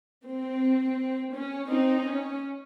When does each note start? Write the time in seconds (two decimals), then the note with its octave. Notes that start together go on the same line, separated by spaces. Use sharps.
0.24 C4
1.32 C#4
1.68 C4 D#4
2.04 C#4